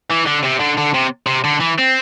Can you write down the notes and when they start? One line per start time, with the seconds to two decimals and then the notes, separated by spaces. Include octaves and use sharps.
0.10 E3
0.26 D3
0.43 C3
0.60 D3
0.77 D3
0.94 C3
1.27 C3
1.44 D3
1.60 E3
1.78 C4